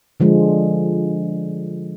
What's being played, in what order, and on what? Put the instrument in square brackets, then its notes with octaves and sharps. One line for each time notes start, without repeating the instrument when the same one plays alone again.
[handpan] D3 F3 G#3